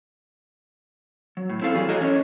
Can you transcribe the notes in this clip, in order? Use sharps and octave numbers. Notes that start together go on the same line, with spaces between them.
F#3
A2
C4 E4 F4 A4 F5
E3 F#3 G3 G#4
F#4 A4 A#4 C#5 D#5
C#4 D4 C#5